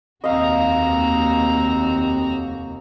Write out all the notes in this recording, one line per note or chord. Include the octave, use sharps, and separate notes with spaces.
F1 D#2 C4 F#4 D#5 F5 A#5